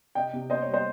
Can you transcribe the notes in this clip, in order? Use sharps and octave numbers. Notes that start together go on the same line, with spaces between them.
C3 D#5 G5
C3
A#3 C5 D#5
C#5
G3
C5 D#5